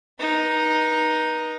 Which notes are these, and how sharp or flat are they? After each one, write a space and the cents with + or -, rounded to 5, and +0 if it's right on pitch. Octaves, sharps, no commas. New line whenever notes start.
D#4 +0 B4 -40